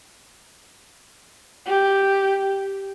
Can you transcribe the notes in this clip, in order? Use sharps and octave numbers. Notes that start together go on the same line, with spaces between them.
G4